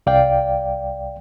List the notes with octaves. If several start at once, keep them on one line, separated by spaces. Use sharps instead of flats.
C2 D5 F5 G5